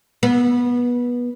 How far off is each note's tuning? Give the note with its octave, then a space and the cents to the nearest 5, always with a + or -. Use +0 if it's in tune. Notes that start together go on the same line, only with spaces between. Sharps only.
B3 -20